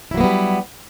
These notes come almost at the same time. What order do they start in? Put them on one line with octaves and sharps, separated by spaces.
E4 F#3 A#3 B3 G3